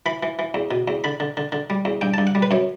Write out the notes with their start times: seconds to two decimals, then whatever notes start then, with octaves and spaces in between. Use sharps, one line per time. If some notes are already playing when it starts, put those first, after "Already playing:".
0.06 E3 B5
0.23 E3
0.39 E3
0.54 E2
0.71 B2
0.88 E2
1.04 D3 B5
1.20 D3
1.37 D3
1.52 D3
1.70 G3
1.85 E2
2.01 G2 G5
2.14 G2 A5
2.27 F#5
2.35 G3
2.42 B4
2.51 F#2 C#5